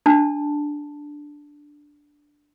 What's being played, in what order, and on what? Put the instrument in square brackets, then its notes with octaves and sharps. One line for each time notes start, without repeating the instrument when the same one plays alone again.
[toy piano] D4 A5